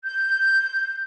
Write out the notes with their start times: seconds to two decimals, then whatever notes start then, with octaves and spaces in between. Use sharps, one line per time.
0.05 G6